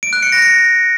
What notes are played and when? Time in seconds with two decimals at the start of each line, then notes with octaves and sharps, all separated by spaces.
0.03 D7
0.13 F#6
0.23 C#7
0.32 A#6
0.42 C#7